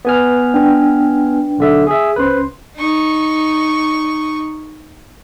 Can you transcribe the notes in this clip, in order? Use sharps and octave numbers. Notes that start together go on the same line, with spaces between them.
B3 B4 G#5 F6
D4 B4 G5
B1 D3 E5
G#4 E5
C#2 C#4 B4 C5 C6
D#4 C#6